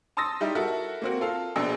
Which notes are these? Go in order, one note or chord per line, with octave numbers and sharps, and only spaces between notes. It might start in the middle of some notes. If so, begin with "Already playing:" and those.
A5 C6 D#6 E6 A6 A#6
G3 D#4 E4 G4
E4 F#4 A4 A#4 E5
A#3 C4 F#4
F4 A4 F5
A#1 B2 G#4 E6